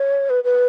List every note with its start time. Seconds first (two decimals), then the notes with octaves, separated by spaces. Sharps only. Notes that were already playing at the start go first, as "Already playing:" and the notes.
Already playing: C#5
0.30 B4
0.44 B4